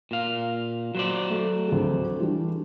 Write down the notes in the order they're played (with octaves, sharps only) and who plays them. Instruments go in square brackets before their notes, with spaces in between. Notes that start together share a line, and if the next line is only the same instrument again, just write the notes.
[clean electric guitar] A#2 F5
F#3 C5 D5
[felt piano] A3 A4
D2 C4 G#4
E3 G3 D4